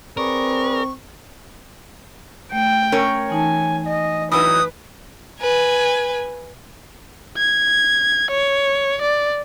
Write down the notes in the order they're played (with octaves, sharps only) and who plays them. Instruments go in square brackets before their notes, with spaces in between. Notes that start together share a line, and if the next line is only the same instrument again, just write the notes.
[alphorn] C4 [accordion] G#4 B4 D5 [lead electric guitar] A#4 [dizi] C#6
[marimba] A3 [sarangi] G5
[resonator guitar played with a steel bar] C#4 A#4 C#5
[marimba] E3 D#4 A5 [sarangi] G#5
[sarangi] D#5
[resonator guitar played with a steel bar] E3 F#3 D#4 [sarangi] B4 [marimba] B5 [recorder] D#6
[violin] B4 G#5
[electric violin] G#6
C#5
D5